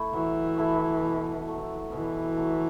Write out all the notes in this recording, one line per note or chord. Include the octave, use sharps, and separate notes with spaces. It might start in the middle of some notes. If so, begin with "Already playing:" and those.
Already playing: A3 E4 A4
E3 F#3
A3 E4 A4
B2
F#3 A3
B2 E3
F#3 A3